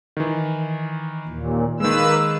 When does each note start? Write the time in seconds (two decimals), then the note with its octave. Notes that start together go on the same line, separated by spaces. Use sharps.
0.17 D#3 E3
1.27 D#2 A#2
1.80 D#3 G#3 A#3 B4 E6